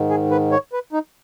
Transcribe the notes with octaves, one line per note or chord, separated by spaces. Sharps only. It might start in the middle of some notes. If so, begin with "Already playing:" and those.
Already playing: G#2 D#3
G#4
B4
C#5
B4
D#4